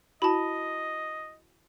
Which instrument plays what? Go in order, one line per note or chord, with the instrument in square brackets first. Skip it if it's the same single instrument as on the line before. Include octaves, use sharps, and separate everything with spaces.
[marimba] E4 F#4 [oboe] D#5 [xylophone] A5 B5